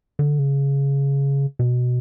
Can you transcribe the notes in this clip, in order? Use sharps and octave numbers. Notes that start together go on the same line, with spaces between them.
D3
C#3
B2